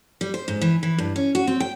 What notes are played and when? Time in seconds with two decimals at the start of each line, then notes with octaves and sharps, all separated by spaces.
0.21 G3
0.34 C5
0.48 G#2
0.61 E3
0.83 E3
0.98 G2
1.16 C#4
1.35 F#4
1.47 C4
1.60 G5